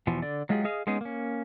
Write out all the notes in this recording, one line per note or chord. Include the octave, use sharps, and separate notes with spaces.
E2 B2 E3 F3
D3 D5
F#3 G#3 F4 G4 G#4
G#4 D#5 F5
G#3 B3 C#4 D#4 G#4
A#3 C#4